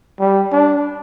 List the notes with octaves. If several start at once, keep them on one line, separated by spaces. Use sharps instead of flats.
G3
D4